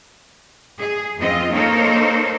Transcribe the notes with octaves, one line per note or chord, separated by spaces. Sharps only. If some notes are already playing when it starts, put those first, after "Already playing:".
G#4
F2 C4 F4 D#5
A#3 D#4 A4 A#4 C5 C#5